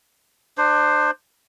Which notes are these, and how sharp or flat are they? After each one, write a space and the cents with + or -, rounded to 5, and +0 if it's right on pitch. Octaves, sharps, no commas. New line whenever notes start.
D4 +30 C5 +0